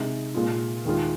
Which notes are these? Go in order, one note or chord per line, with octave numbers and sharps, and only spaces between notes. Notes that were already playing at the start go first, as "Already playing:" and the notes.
Already playing: C3 G#3 D#4
A#2 G#3 F4
D#2 D#3 G#3 F4